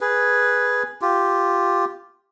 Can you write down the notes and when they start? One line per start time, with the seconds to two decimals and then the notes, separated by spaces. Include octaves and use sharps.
0.01 G#4 B4
1.02 F4 G4